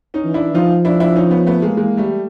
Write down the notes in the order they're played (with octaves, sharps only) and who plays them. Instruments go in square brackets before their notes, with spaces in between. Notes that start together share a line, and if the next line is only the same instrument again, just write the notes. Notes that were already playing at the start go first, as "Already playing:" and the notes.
[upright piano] C#4 D#4
[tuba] E3
[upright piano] D4 E4
[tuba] F3 [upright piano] D#4 F4
[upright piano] D4 E4
D4 E4
C#4 D#4
B3 C#4
A3 B3
G#3 A#3
[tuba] E3 [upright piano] G#3 A#3
[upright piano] G3 A3